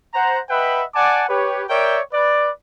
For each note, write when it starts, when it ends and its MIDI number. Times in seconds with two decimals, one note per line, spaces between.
0.14 0.39 72
0.14 0.39 78
0.14 0.39 82
0.50 0.83 71
0.50 0.83 75
0.50 0.83 76
0.50 0.83 78
0.50 0.83 79
0.50 0.83 83
0.95 1.23 74
0.95 1.23 78
0.95 1.23 80
0.95 1.23 81
0.95 1.23 86
1.29 1.64 67
1.29 1.64 71
1.29 1.64 73
1.69 1.99 70
1.69 1.99 73
1.69 1.99 74
1.69 1.99 76
1.69 1.99 79
2.12 2.50 71
2.12 2.50 74